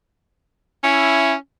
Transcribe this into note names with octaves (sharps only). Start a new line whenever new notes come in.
C#4 E4